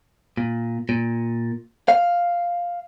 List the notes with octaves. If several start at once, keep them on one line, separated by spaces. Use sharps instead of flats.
A#2
A#2
F5